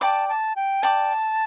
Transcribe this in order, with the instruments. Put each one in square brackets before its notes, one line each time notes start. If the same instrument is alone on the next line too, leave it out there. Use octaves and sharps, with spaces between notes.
[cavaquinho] D5 G5 D6 [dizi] A5 B5
[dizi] A5
G5
[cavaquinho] D5 G5 D6 [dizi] A5